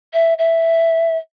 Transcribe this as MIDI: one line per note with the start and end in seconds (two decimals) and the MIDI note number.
0.13 0.34 76
0.39 1.17 76